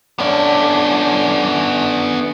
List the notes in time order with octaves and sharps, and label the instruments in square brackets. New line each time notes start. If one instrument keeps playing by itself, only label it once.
[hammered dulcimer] D3 C#4 D6 [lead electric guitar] B3 D5